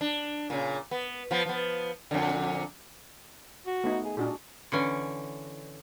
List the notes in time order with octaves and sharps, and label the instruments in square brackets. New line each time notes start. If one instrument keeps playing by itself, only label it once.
[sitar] D4
A#2 C#3
B3
F3 B3
F3 B3
F2 A#2 D3
[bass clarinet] F#4
[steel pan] A3 B3 D#4
[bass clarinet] G#4
[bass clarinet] A#2 [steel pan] D4 F#4 G#4
[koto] D3 E3 C#4